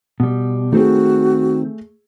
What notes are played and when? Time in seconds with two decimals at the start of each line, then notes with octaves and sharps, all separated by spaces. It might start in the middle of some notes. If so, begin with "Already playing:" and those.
0.20 B2 G3
0.72 D#3 A3 C4 F#4 G#4